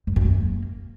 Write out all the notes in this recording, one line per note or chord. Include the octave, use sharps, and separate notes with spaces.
G2
F#2
A#3